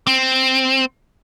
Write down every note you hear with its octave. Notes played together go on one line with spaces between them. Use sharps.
C4